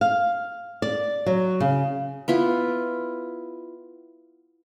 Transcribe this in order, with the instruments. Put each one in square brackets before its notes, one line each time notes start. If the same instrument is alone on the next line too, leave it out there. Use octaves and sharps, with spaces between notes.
[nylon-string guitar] F5
D5
F#3
C#3
[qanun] B3 E4 F4